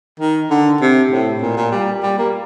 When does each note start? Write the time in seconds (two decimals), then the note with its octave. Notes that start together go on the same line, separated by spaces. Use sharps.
0.20 D#3
0.50 D3
0.81 C3
1.11 A2
1.42 A#2
1.57 A#2
1.72 G3
2.03 G3
2.18 A#3